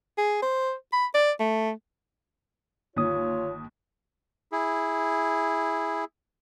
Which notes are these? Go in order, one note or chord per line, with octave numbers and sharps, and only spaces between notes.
G#4
C5
B5
D5
A3
G1 D#2 F4 C#5 D#6
E4 G#4